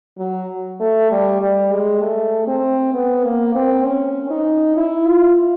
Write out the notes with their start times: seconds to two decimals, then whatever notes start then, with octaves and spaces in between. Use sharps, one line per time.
0.19 F#3
0.80 A3
1.11 G3
1.42 G3
1.72 G#3
2.02 A3
2.47 C4
2.94 B3
3.24 A#3
3.55 C4
3.85 C#4
4.30 D#4
4.77 E4
5.07 F4